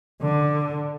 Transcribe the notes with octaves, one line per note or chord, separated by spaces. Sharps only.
D3